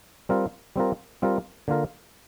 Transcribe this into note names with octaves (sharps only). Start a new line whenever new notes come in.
G3 C4 F4 A#4
G3 C4 F4 A#4
G3 C4 F4 A#4
D3 A#3 F4 A#4